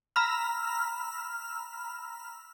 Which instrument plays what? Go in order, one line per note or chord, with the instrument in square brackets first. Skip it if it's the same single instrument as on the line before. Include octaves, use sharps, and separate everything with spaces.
[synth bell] A#5 B5 E6 F6